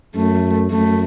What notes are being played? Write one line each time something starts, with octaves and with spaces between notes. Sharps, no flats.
F#2 A3
F#2 A3